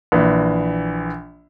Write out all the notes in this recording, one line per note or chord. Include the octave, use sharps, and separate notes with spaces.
A#1 E3